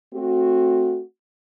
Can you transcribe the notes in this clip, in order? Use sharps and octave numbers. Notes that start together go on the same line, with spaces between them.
A3 C4 F#4